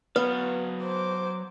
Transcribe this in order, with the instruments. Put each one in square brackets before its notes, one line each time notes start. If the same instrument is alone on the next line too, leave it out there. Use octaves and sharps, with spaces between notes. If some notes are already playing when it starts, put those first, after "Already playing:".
[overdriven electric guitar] F#3 F5 [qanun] B3 [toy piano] B4
[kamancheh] C5 D6